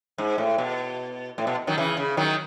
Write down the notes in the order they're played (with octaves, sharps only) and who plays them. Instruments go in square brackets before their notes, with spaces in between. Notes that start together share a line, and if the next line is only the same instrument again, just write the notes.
[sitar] G#2
A2
B2
A2
B2
D#3 F#3
C#3 E3
C#3
D#3 F#3